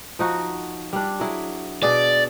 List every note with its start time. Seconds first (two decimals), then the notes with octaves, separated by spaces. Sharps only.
0.19 F3 D#4 F#4
0.93 G3 D4
1.19 F#3 E4 G#4
1.83 B2 G#4 D5